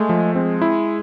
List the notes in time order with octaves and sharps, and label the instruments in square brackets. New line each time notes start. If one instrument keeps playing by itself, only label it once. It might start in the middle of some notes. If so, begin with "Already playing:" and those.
Already playing: [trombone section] G#3 [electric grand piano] A3
[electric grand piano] F3
[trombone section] G#3 [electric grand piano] C4
[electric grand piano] E4